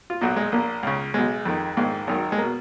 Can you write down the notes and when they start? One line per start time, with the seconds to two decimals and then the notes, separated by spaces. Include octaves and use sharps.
0.10 F4
0.21 B1 A#2 F#4
0.36 G#3
0.52 A#1 A#2 A#3
0.83 C#2 C#3
1.14 B1 B2 G#3
1.45 F2 D#3
1.77 A#1 G#2 D#3
2.07 G#1 F#2 D#3
2.32 G#3
2.38 B2 A#3